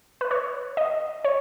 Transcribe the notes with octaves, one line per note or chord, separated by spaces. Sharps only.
B4
C#5
D#5
C#5